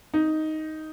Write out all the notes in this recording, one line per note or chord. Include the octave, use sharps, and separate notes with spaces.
D#4